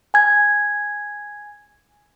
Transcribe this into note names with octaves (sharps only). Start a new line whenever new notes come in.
G#5 G#6